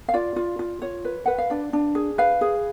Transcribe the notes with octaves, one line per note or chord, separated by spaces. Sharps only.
F5
F4 D5
F4
F4
F4 C#5
B4
B4 F#5
F5
D4 D5
D4
G#4
B4 F5
G#4